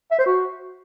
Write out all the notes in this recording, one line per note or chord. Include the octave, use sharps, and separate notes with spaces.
E5
C5
F#4